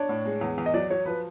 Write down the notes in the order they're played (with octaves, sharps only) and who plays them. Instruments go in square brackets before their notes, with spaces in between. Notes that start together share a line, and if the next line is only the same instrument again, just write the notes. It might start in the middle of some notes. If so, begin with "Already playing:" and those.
Already playing: [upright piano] D4 [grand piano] C#5
[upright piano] A2
G#3
E2
E2
[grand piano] D#5
[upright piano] F#3 [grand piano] D5
[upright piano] F#3 [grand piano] C#5
[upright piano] F3 [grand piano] B4